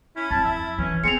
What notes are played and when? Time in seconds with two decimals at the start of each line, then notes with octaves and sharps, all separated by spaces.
0.16 C#4 E4
0.31 F2 A5
0.44 E5
0.78 E3 C#4
1.04 B3 C4 G#4 C#7 F7